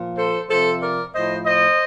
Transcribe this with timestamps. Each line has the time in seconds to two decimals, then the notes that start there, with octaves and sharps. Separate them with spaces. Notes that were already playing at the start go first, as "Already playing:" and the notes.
Already playing: A#2 F3
0.17 A4 C5
0.49 C3 F3 A4 C5
0.81 A#4 D5
1.13 A2 F3 C5 D#5
1.45 C5 D#5